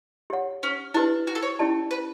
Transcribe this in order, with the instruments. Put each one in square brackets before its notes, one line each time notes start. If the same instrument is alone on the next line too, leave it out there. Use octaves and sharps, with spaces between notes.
[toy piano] G4 C#5 F#5
[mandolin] C#4
[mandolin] D4 [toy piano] E4 G4 B4
[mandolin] F#4
A4
C#5
[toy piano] C#4 E4 G4 D5 A5
[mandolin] B4